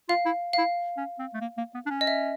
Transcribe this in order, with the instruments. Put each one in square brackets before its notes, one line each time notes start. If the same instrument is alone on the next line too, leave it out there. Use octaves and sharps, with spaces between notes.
[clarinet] F4 [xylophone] F5
[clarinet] E4
[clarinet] E4 [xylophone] F5
[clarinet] C#4
C4
A3
A#3
A#3
B3
D4
C#4
[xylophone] D#5
E5